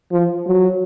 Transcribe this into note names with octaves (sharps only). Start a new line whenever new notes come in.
F3
F#3